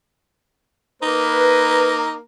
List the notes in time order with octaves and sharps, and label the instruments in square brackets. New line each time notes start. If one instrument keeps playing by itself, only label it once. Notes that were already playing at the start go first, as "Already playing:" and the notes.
[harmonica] A#3 [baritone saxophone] D#4 [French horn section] B4